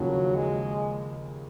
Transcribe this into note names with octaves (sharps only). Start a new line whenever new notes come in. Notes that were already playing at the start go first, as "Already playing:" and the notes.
Already playing: D#2 C#3 F3 F#3
G#3